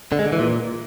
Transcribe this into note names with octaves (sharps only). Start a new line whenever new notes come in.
D3
G#3
D3
E3
A#2